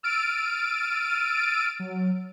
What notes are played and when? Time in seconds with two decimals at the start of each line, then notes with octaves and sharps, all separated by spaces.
0.03 E6 F6 A6 D7 D#7
1.80 F#3